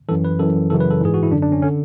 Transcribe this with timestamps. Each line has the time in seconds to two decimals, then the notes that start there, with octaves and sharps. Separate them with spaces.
0.09 F#2 E3 A4
0.24 B4
0.39 F#2 E3 A4
0.70 F#2 C#3 E3 A4
0.80 B4
0.90 A4
1.01 G#2 E3 G#4
1.14 F#4
1.23 E4
1.32 F#2 D3 D4
1.42 D4
1.52 C#4
1.62 D3 C#4